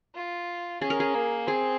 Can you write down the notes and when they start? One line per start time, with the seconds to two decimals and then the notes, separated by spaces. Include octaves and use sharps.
0.15 F4
0.81 C#4 G#4
0.90 A#4
1.00 G#4
1.14 A#3
1.47 C4 G#4